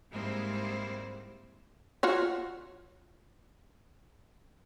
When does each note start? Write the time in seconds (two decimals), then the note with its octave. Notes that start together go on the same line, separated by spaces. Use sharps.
0.10 G#2 G3 G#3 A#3 C4 E4
2.03 F4 F#4 C#5